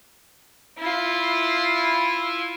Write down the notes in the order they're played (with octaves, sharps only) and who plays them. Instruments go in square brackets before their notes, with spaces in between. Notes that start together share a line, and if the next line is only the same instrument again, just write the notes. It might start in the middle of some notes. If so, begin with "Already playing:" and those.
[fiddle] E4 F4